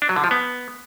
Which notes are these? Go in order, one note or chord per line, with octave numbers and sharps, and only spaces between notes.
D4
F#3
D3
F3
B3